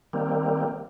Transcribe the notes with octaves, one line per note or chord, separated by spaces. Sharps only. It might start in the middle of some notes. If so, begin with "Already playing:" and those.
D#3 G3 A#3 C4